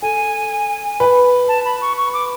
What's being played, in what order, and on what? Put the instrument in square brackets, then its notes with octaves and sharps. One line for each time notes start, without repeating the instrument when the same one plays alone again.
[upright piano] A4 [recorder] G#5
[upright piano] B4
[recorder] A5
B5
C#6
C#6
D6